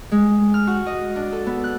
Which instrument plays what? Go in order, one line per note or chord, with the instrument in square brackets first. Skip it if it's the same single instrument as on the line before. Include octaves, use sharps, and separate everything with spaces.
[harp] G#3
F6
F#4
D#5
D4
A4
B3
F#6